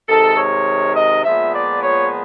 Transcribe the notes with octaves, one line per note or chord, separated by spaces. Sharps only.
C3 D#3 G#3 A4
C#5
D#5
A#2 F3 G#3 B3 E5
D5
C#5